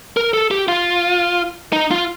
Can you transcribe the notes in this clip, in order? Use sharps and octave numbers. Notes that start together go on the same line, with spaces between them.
A#4
A4
G4
F4
D#4
F4